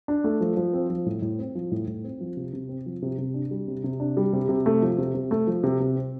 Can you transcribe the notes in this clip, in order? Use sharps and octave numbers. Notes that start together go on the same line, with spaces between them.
D4
A3
F3
F3
C4
F3
A2
A2
C4
F3
A2
A2
C4
F3
C3
C3
C4
F3
C3
C3
D4
G3
C3
C3
D4
G3
C3
C3
A3
F3
C3
C3
A3
F3
C3
C3
C4